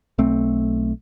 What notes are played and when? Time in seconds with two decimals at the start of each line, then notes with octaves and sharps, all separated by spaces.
0.18 B1 A3 C4